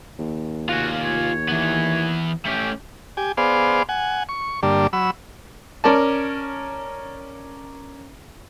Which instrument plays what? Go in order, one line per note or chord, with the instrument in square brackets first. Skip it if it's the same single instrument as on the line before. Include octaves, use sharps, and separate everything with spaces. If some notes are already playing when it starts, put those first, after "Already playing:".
[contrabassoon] D#2
[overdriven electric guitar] F4 G#5 [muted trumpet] F#4
[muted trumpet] C#5
[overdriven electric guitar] E3 B3
[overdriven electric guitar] A3 C#4 [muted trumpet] G4
[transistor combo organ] G4 G#5
B3 G#4 C5 D5 F5
F#5 G#5
C#6
G2 D3 G3 A#3 D4
F#3 B5 E6
[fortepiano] C#4 A#4 D5 A5